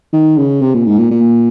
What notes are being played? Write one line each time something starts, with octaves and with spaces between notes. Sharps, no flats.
D#3
C#3
C3
A#2
G#2
A#2
A#2